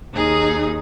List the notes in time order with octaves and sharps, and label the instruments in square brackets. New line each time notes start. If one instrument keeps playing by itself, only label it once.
[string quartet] D#2 D#4 G#4 D#6